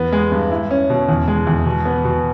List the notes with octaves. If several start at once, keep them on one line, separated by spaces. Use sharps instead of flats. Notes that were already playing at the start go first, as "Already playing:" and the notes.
Already playing: E2 B3
G#3
G2
E4
C#4
B2
E2
G#3
E2
B2
B3
B2